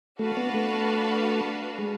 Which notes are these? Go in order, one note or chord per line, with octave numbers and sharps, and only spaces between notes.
A3 D4 F#4 B4 F5 A5
B3
A3
G#3